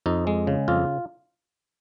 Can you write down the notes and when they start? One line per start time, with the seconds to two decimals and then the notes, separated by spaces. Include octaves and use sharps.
0.06 F2 D#4
0.27 G#3
0.47 C#3
0.68 F2 F4